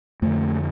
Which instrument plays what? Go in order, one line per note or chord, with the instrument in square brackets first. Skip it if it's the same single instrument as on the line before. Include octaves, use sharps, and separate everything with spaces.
[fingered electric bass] F2 D3 A3